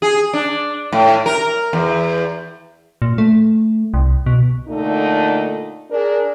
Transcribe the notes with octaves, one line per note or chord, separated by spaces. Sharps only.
G#4
D4
A2
A#4
E2
A#2
A3
C2
B2
A#2 D3 A3 D#4
D4 G#4 A#4